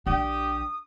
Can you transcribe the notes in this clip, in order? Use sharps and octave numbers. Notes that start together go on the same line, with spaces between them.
A#1 D4 G4 D#6